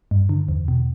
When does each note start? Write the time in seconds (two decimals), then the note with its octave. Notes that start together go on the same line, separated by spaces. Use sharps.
0.11 G2
0.29 D3
0.48 E2
0.68 B2